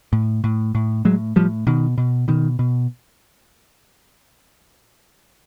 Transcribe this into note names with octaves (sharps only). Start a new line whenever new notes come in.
A2
A2
A2
A2 F#3 G#3
A2 F3 G3
B2 D#3
B2
B2 D#3
B2